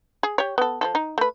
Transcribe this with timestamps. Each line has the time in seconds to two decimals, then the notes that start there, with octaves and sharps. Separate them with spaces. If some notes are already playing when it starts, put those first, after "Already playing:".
0.23 G#4
0.38 G4 C#5
0.58 B3 A4
0.81 F3 F4 A4
0.95 D#4
1.18 A3 B4